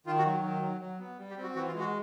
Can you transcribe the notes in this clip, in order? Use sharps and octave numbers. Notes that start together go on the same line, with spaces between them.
D#3 F4
F#4
F#3
D#3
F#3
F#3
B3
G3
G4
C4
F#4
E3 F#4
F4
G#3
F#4